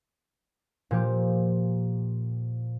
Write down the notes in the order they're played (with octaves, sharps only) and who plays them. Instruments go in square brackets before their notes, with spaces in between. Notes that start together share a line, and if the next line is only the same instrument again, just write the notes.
[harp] A#2 F3 G4